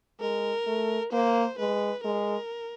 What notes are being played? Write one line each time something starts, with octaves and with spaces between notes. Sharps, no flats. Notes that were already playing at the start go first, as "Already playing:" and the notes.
G#3 A#4
A3
A#3 C5
G#3 B4
G#3 A#4